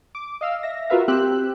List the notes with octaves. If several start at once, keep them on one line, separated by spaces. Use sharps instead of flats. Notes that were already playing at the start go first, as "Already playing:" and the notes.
D6
D#5 F5 E6
E5 A#6
F4 F#4 A#4 B4 E5 F5
C4 G4 E6 F#6